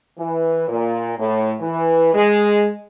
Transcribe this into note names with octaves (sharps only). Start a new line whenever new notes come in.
E3
A#2
A2
E3
G#3